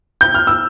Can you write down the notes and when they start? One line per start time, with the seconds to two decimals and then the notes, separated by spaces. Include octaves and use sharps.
0.21 G6
0.34 F6
0.47 E6